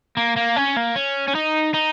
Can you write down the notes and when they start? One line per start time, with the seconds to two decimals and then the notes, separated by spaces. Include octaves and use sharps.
0.17 A#3
0.37 A#3
0.56 C#4
0.76 A#3
0.96 C#4
1.28 C#4
1.35 D#4
1.74 D#4